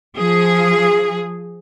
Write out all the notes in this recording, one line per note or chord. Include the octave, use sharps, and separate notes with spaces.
F3 G#4